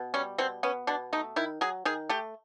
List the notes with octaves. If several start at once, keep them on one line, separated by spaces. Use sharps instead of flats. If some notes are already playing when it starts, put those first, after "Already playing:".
Already playing: B2
G3 C#4
B2 C4
B3 C#4
B2 D4
A3 D#4
D#3 E4
F#3 G#4
D#3 G#4
A3 G4